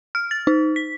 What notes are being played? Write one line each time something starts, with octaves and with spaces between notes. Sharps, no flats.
F6
A6
D#4
B6